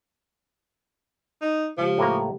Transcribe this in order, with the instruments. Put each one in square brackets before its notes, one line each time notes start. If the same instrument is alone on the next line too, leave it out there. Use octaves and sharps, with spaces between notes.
[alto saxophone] D#4
[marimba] C#3 G#3 G4 [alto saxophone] F3
[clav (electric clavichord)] A2 A#3 A#5